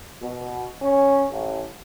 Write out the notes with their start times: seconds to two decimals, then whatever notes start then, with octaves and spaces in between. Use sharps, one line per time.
0.22 B2
0.82 C#4
1.30 A1